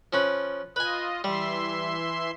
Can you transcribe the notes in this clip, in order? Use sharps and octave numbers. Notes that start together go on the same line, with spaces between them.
F3 C#4 B4
F4 B4 D#5 G#5
E3 G3 E5 C6